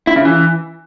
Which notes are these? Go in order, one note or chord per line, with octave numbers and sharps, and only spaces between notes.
E4
C#3
E3